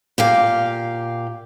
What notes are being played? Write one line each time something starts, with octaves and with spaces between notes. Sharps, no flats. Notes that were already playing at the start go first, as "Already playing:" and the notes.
A#2 G4 F5